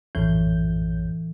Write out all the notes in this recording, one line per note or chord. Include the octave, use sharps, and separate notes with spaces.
A#1 F#2 A2 E3 G6